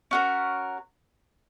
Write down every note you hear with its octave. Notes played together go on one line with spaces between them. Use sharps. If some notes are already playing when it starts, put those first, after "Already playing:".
C#4 F#4 A#4